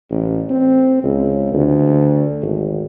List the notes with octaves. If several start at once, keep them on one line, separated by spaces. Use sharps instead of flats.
A1
C4
C#2
D2
G#1